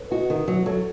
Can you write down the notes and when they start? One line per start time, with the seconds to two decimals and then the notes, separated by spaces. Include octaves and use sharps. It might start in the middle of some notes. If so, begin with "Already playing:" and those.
Already playing: A4 B4 C#5
0.11 F#4 B4 D#5
0.30 D#3
0.48 F#3
0.66 F#3 A4 C#5